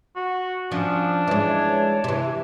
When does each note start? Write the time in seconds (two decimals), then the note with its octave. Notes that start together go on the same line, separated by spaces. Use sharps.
0.16 F#4
0.71 F3 C#4 D4
1.27 E3 G#3 C#5
2.04 C3 E3